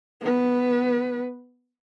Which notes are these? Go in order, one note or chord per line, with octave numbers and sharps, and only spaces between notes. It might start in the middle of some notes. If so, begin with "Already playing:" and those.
B3 B4